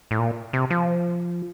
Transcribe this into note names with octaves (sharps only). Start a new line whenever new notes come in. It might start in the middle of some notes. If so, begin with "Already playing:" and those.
A2
A#2
C3
F3